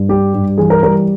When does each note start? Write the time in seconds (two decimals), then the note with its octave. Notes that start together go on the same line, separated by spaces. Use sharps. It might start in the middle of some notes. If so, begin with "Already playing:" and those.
Already playing: G2
0.09 G3 G4
0.34 G2
0.58 E3 G#4
0.70 A#4
0.83 G3 A#4